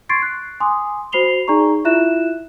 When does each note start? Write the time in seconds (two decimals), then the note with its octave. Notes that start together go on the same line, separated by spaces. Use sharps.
0.09 C6 C#6 G#6 A6 C7 D7
0.22 F#6
0.60 G#5 C6 D6 D#6
1.12 F#4 C5 B5 C7 F7 G7
1.48 D#4 G#4 D5 A#5 C#6
1.85 E4 F4 E5 F#6 E7